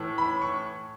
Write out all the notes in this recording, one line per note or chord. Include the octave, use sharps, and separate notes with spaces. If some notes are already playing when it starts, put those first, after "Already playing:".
Already playing: A2 E3
B5
C#6